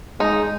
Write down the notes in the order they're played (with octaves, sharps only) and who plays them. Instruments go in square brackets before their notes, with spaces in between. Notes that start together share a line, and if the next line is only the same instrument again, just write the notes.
[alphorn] G#3 [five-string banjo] D#4